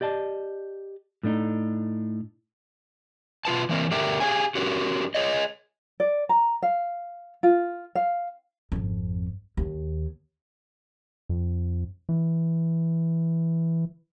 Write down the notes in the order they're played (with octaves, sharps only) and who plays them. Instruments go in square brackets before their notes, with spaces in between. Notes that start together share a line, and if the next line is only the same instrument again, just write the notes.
[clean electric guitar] G4 D5 D#5 A5
A2 A3 D4 D#4
[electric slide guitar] B2 F4 B4 A5
E3 A#3 C4 A#4
D3 G4 A#4 E5 G5
G4 G#4 A#4 C5 F5 G#5
C#4 F#4 G4 A#4
G#4 C#5 D#5
[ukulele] D5
A#5
F5
F4
F5
[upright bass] G#1 F2
D#2
[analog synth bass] F2
E3